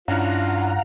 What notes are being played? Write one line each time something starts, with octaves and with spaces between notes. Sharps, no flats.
G2 C#4 D4 E4 F4 F5 F#5 A#5